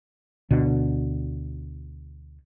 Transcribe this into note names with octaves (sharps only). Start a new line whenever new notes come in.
D2 B2 D3